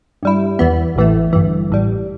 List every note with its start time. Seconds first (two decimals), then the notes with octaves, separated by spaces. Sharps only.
0.23 G2 G3 E4
0.59 E2 E3 B3
0.96 A1 A2 E3 A3
1.33 G1 G2 E3
1.70 A1 A2 G3